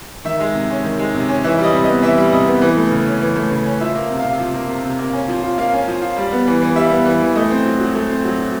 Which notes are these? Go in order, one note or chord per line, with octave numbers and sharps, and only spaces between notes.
D#3 E5
G#3
C3
C#4
D#3
G#3
C3
C#4
E3 E5
G3 D#5
C3
B3 D#5
E3 E5
G3
C3 D#5
B3
E3
A3
C#3
C#4
E3
A3
C#3
C#4
F3 E5
A#3
C3
F5
C3
F3
A#3
C3
C3
A#3
C#4
F3
F4
A#3 F5
C#4
F3
F4
G3
B3
E3
E3
G3 E5
B3
E3
E3
A3 D#5
C4
F#3
F#3
A3
C4
F#3
F#3